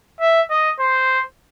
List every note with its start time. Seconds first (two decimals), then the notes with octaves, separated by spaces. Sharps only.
0.21 E5
0.51 D#5
0.80 C5